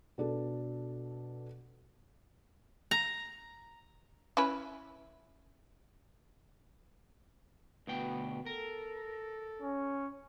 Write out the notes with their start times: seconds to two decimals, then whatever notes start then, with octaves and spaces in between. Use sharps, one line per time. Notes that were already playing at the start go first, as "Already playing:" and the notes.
0.18 B2 D4 A4
2.91 A#5
4.37 C#4 E4 B4
7.87 D2 B2 B3 G5
8.46 A4 A#4
9.62 C#4